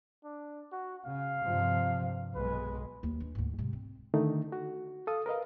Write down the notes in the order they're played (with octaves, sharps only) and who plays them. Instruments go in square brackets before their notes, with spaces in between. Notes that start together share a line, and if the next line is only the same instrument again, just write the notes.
[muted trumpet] D4
F#4
[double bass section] C#3 [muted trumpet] F5
[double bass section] G2 C3 F3
[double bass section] B1 G#3 [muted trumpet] B4
[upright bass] D#2
D4
D2 G#2
C3 G#3
C4
[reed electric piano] D3 D#3 A3 D#4
F#4
A4 F5 D#6
A#4 B4 D#5 F5